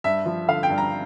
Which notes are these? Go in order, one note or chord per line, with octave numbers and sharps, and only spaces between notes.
G2 E5
F3
D3 F5
G5
G2
A#5